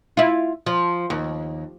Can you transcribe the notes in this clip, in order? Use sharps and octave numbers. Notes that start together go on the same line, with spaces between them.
E4 F4
F3
D#2